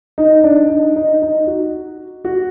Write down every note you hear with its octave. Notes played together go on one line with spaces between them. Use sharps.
D#4
D4
D#4
D#4
D#4
F#4
F#4